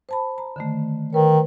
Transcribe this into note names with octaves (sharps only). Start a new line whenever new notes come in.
C5 A5 B5
A#5
D3 D#3 A3
D#3 A#4 B4 C#5